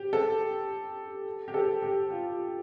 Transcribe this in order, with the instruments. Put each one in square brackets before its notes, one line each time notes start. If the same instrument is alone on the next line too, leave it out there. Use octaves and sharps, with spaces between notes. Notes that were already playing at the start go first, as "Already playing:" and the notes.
Already playing: [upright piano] G4
A4
G4
A4
G4
F4